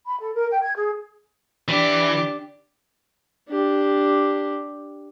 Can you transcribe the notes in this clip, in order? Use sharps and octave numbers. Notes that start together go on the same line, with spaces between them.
B5
A4
A#4
G5
G#6
G#4
E3 D4 G4
D4 G4